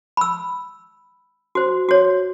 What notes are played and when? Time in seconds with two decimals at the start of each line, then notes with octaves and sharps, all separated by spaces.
0.17 B5 E6
1.55 F#4 C5
1.89 F#4 C#5